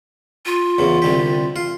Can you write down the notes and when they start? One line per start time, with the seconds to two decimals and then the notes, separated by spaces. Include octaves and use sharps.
0.46 F4
0.78 E2 C#3
1.02 C2 D3 G4
1.56 F4